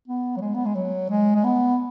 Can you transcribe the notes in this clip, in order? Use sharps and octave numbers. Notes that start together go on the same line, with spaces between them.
B3
F#3
G#3
B3
G#3
F#3
G#3
G#3
B3